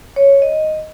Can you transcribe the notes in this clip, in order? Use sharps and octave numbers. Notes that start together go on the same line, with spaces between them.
C#5
D#5